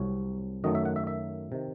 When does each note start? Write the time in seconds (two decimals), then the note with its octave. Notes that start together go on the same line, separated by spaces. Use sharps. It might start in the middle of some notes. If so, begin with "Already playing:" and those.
Already playing: C2 C3 F#3 C#5
0.64 F#2 D#3 F#3 A3 D#5
0.75 E5
0.85 F#5
0.96 E5
1.07 E5
1.52 C3 D#3